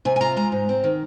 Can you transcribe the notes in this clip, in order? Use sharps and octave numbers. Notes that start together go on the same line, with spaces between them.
C3 G#5
G#5
F4 A#5
G#3 A#5
G#2
C4
D#3